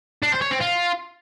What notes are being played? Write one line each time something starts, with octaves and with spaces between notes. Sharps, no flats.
D4
C5
C#5
C4
F4